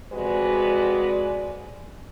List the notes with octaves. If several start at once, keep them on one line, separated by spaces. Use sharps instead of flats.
F2 C3 G#3 F#4 B4 D5